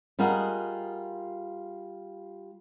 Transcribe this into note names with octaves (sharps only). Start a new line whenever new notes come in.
G3 F4 G#4 A#4 D#5 F#5